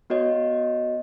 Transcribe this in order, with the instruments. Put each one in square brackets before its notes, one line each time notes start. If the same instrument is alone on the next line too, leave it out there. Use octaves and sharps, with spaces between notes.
[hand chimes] B3 F#4 C#5 D#5